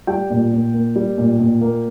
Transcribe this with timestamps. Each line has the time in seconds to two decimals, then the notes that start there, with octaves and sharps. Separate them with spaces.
0.07 G3 G5
0.30 A#2
0.52 A#2
0.74 A#3
0.96 G3
1.18 A#2
1.40 A#2
1.61 A#3